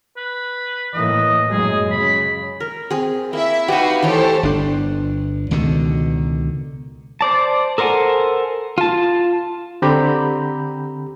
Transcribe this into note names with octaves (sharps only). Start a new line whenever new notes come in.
B4
A2 E3 A#3 D#5
F#2 F#3 G#3 G#4
C#3 B5
A#4
C4 G#4
A#3 E4 E5
D#4 F#4 G4 B4 F5
E3 A3 G4 A4 C5 C#5
G1 D4
C#2 B2 D3 D#3
C5 D5 A5
A4 A#4 C5 F#5 G#5
F4 A5
D3 C4 G4 A#5 B5 G6